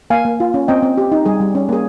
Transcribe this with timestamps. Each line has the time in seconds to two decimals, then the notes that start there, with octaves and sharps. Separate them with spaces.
0.10 A#3 F5 G#5
0.25 A#3
0.40 F4
0.54 C#4
0.68 C4 D#5 G5
0.83 C4
0.98 G4
1.12 D#4
1.26 G3 G#4
1.40 G3
1.55 C#4
1.69 A#3 G#4